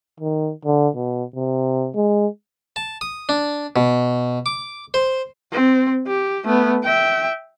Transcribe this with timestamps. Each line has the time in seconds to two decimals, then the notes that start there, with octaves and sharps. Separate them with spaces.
0.20 D#3
0.65 D3
0.95 B2
1.36 C3
1.95 G#3
2.76 A5
3.01 D#6
3.29 D4
3.76 B2
4.46 D6
4.94 C5
5.52 C4
6.07 G4
6.45 A3 B3
6.84 E5 G5